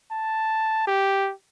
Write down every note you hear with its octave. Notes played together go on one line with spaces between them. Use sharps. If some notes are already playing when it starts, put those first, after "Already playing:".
A5
G4